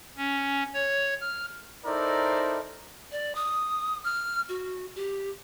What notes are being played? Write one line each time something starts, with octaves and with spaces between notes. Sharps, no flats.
C#4
C#5
F6
D#4 E4 A4 A#4 C5 D5
D5
D#6
F6
F#4
G4